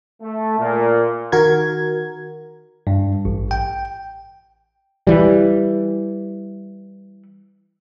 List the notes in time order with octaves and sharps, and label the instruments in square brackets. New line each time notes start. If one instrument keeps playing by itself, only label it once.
[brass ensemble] A3
A#2
[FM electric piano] D#3 F#4 A#4 G#6
[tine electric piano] G2
A1
G5
[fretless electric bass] E3 G3